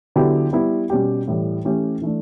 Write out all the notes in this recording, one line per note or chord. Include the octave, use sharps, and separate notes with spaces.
D3 F#3 B3 E4 G4
G3 B3 E4
B2 G3 C#4 G4
A2 E3 G3
E3 A3 C#4 G4
E3 A3 D4